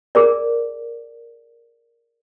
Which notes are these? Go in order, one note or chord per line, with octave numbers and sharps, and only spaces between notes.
G#4 A#4 D5